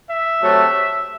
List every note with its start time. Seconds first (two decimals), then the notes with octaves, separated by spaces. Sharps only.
0.09 E5
0.42 C3 F#3 A3